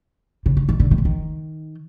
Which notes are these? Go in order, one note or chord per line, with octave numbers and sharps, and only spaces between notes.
C#3
D3
D#3
D3
D#3
D3
D#3